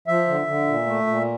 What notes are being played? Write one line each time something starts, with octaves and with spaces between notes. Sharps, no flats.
F3 E5
D3
D3
A#2
A3
A#2